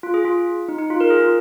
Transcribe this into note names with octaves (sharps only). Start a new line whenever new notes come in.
F4
G#4
F4
D#4
D#4
F4
A#4
G#4
F4